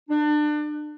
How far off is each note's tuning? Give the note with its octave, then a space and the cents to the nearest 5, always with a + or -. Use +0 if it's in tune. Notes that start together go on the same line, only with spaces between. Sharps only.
D4 +30